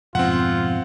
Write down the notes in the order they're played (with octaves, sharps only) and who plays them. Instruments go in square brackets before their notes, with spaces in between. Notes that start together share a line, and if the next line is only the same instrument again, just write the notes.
[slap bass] F2 G#2 B2 [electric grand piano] C4 F#5 [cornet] F4